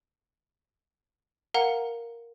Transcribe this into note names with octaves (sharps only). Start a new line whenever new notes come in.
A#4 F5 F#5 A#5 C#7